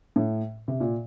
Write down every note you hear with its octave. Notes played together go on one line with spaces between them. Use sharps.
A2
C3
A#2